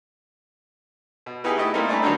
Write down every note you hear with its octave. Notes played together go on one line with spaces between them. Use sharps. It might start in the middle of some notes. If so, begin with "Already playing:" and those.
B2
B3 D#4 E4 G4 G#4
A3 B3 E4 G4 D#5
G3 A3 A#3 C4 D#4 E4
A3 D4 G#5 A#5 B5
G2 D3 D#3 F#3 D4 D#4